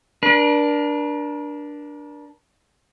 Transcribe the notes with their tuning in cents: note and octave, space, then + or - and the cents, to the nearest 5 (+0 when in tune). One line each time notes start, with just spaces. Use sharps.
D4 +0 A#4 +40